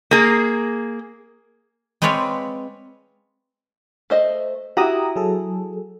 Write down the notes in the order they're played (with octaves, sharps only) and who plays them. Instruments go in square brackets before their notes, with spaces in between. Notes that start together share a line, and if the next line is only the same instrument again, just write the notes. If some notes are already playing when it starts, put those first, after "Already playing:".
[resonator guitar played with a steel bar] A#3 G#4
[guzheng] G#3 C4 B4 C#5 D5 F5
[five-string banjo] A3 C5 D#5
[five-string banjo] E4 F#4 [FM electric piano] G4 A#5 D#6
[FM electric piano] F#3 G#4 A4